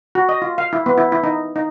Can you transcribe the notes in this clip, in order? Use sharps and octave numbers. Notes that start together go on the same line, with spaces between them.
F#4
D#5
F4
F5
E4
B3
E4
E4
D#4
D#4